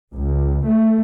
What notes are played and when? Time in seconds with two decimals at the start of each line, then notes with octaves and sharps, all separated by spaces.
0.12 C#2
0.65 A3